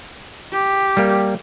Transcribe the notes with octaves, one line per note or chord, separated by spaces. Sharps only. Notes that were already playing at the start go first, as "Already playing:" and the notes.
G4
G3 A#3